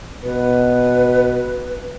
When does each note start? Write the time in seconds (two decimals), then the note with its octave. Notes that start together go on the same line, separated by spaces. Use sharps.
0.24 B2 B4